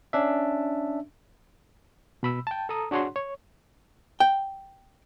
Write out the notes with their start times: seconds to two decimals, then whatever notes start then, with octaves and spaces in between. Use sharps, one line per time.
0.13 C#4 D4 E5
2.23 B2 B5 E6
2.47 G5 A5
2.69 A4 A#5 D#6
2.91 D4 F#4 G#4 C#5 F#5 C6
3.16 C#5
4.20 G5